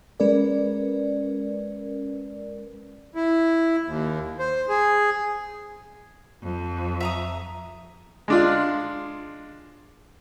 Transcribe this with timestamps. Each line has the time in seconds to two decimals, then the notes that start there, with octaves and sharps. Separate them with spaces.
0.20 G#3 C#4 A#4 B4 D5
3.15 E4
3.86 D#2
4.39 C5
4.69 G#4
6.43 F2
7.00 E5 A#5 D#6
8.28 G#3 D4 F4